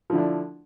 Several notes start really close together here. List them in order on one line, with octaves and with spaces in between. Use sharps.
F3 D3 E4 D4